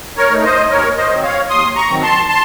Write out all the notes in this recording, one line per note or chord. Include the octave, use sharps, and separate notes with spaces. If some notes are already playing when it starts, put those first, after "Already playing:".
A#4 C#5
A3 D#4
C5 D#5
D#2 A#4 C#5
C5 D#5
D#3 F#3 C4
C#5 F5
D#2 C6 D#6
A#5 C#6
D#3 F#3 C4
A5 C6
A5 C6